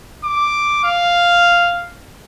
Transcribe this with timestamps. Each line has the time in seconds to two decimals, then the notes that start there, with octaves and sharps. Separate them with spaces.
0.25 D6
0.84 F5